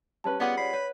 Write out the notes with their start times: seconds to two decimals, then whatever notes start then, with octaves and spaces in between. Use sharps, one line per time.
0.24 G3 C#4 B4 A5
0.40 B3 F4 G#4 D5 F#5 D6
0.57 C#5 D5 B5 C7
0.73 B4 C#5